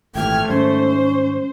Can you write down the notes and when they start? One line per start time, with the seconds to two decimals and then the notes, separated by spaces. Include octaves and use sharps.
0.15 G#1 A#2 E3 A3 G5 F6 G#6
0.49 G#2 D#3 G3 C#4 C5